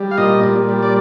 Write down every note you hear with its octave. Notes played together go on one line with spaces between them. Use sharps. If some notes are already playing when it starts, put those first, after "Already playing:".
Already playing: G3
F5
A#2 D#5
A#2
G3
D5